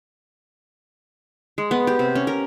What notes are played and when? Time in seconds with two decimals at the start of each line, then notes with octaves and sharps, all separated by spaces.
1.58 G#3
1.71 B3
1.87 G4
1.99 C3
2.15 C#4
2.27 A#4